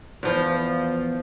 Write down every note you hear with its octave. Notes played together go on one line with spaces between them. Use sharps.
E2 F3